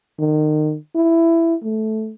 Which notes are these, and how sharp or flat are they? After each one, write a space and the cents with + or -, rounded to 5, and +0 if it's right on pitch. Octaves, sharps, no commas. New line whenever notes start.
D#3 -30
E4 +10
A3 -10